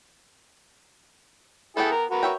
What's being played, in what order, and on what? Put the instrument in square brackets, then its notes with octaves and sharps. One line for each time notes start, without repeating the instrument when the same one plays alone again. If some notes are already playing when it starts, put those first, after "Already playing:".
[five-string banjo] E3 B3 G5 [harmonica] E4 G#4 A4
[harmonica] A#4
F#4 A#4 B4
[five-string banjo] C#5 E5 G5